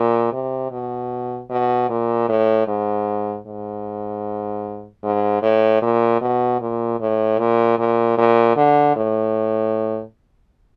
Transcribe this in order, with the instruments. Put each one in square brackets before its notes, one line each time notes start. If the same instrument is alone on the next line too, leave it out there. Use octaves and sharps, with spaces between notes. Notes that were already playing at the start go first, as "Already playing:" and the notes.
Already playing: [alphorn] A#2
C3
B2
B2
A#2
A2
G#2
G#2
G#2
A2
A#2
B2
A#2
A2
A#2
A#2
A#2
D3
A2